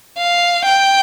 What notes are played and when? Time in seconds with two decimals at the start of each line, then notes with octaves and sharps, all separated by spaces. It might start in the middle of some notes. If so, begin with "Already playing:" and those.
0.18 F5
0.65 G5